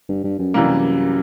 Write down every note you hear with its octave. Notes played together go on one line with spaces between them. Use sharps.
G2
G2
F#2
C3 E3 G3 A#3